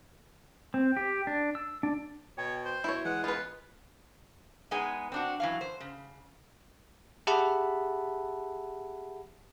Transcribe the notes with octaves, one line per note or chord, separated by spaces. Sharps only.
C4
G4
D4
E6
D4
B2 C#5 G5
C5
B2 E4 C#5
E3 G#3 F#5
B3 F4 B4
G#3 B3 D#4 G#4 G#5
C4 D4 F#4
E3 F#3 F5
C5
C#3
G4 G#4 E5 F#5 A5 B5